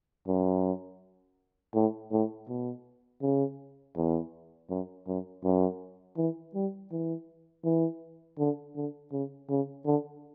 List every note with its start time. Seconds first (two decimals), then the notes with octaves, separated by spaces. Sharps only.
0.28 F#2
1.75 A2
2.12 A2
2.49 B2
3.22 C#3
3.96 E2
4.70 F#2
5.07 F#2
5.44 F#2
6.17 E3
6.55 G3
6.92 E3
7.64 E3
8.39 D3
8.76 D3
9.12 C#3
9.50 C#3
9.86 D3